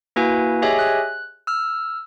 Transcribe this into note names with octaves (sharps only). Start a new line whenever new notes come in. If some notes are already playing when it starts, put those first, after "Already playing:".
A#3 E4 F#4 B4 G#5
G4 G#4 C#5 D#5 E5 G#5
F#6
E6 F6